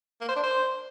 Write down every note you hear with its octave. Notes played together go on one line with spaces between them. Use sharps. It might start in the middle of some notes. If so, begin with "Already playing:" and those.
A#3
C5
D4
C5